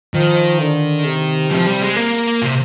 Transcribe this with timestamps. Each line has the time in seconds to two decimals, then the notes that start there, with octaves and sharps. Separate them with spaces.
0.15 D#3 F3
0.60 D3
1.05 C3
1.51 C3 F3
1.67 G3
1.82 G#3
1.97 A#3
2.42 C3